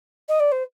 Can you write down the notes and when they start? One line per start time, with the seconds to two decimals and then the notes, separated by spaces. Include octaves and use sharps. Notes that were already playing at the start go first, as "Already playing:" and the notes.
0.28 D#5
0.40 D5
0.52 C5